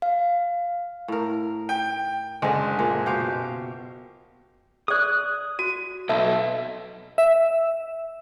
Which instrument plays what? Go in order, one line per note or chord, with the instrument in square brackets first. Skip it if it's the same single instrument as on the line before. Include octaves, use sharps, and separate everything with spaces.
[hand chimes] F5
[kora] A2 A#4
[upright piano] G5
[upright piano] F#1 [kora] D3 G#3
[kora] A#2 G#3
B2 G4 F5
[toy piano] G#4 D5 [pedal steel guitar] D#6 F#6
[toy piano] F#4 [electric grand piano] D#7
[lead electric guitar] B1 [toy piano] A4 A5 [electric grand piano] E5
[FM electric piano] E5